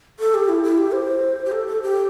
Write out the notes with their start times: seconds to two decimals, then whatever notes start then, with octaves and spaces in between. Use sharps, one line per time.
0.20 A4
0.34 G4
0.49 E4
0.64 E4
0.78 G4
0.93 C5
1.45 G4
1.52 A4
1.67 A4
1.82 G4